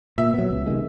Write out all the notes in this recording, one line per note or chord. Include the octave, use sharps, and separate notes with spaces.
A#2 E5
F#3 B3
C#2
C3 D#3 G#3